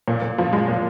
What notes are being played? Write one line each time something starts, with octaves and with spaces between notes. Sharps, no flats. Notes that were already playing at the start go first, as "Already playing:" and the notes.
A#2
A#2
F3
G#3
A#2